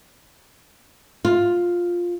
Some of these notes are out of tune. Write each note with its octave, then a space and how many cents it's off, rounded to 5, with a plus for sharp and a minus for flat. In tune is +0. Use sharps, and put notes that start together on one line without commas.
F4 +5